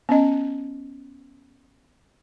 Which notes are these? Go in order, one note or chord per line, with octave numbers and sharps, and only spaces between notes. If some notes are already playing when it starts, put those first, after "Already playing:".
B3 C#4 D#5